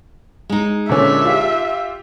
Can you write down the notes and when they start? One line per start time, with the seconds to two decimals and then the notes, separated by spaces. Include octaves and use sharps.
0.50 G#3 D#4
0.89 A#2 D3 C#4 E5
1.25 F4 G4